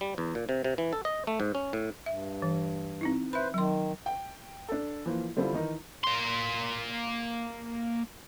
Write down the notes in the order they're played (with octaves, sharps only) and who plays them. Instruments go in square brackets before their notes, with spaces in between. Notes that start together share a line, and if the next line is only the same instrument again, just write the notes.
[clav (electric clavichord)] G3
E2
A#2
C3
C3
E3
A4
D#5
A3
G#2
C#4
A2
[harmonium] G2 [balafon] E5
[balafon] E3
C4 D#4 E4
[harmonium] B4 C5 [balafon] E5 B5
[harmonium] D#3 [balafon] F#3 C6
[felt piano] G5
D4 A4
E3 F3 A#3
D3 G3 C4 D4 E4 F4
D#3 E3 D#4 A#4
[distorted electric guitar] A#3 C6